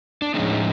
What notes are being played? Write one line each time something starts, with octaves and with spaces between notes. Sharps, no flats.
D4
A2 F3 G#3 C#4 D#4